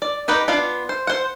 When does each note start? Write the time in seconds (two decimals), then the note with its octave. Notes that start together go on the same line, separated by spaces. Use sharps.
0.02 D5
0.28 D#4 G4 B4 D#5
0.48 B3 D4 F4 F5
0.89 C5
1.07 C5 F#5